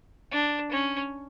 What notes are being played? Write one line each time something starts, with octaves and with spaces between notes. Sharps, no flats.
D4
C#4